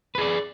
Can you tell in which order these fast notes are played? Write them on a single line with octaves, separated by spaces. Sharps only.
B4 G#4 D5